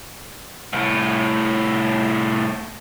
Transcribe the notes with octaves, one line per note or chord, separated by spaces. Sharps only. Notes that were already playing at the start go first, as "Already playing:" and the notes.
C2 A2